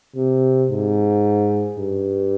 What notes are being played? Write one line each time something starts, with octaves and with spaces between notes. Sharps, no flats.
C3
G#2
G2